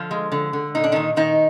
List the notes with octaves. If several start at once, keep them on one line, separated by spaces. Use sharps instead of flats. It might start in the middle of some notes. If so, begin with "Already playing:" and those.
Already playing: D3 F3 F4
G#3
D3
D3
A#2 D#4
D4
A#2 D#3 D#4
A#2 D#3 D#4